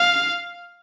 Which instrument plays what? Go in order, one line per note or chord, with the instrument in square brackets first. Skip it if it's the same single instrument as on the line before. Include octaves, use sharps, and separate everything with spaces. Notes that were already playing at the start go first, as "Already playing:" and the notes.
Already playing: [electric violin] F5